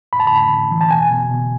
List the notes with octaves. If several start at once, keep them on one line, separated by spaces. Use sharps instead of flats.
A2 B5
A5
A2 B5
A2
E3
A5
B2 G#5
B2
B2